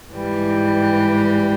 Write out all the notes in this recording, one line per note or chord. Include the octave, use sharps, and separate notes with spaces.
G#2 E3 G3